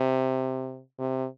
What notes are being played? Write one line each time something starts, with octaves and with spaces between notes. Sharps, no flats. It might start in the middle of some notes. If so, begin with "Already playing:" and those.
Already playing: C3
C3